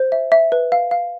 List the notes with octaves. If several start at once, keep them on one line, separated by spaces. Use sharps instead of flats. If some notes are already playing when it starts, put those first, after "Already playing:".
Already playing: C5
E5
E5
B4
F5
F5